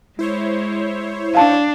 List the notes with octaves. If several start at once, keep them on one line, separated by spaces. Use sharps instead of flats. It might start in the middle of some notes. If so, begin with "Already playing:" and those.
G#3 E4 C5 C#5
D4 F5 A5